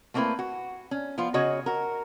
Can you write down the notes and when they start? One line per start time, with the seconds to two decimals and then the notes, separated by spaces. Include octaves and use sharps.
0.14 A3 A#3 C4 D#4 E4 B4
0.39 F#4
0.91 C#4
1.18 F3 B3 F4
1.34 C#3 F#4 C#5 D#5
1.66 F#4 A#4